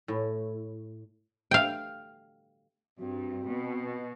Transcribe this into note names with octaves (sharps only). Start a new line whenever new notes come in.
A2
F5 G5
G2 C4 F#4
B2